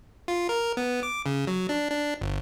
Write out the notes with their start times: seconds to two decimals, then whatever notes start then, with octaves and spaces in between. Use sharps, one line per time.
0.28 F4
0.49 A#4
0.77 B3
1.03 D6
1.26 C#3
1.47 F#3
1.69 D4
1.91 D4
2.21 G1